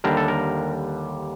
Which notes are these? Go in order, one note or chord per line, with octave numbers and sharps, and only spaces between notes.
D#2 D3 G3 D4 A#4
A4
A#4